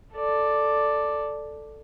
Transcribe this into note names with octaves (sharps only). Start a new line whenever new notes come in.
A4 D5